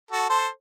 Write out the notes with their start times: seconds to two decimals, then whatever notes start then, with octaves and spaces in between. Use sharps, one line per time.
0.11 F#4 A4
0.29 A4 C5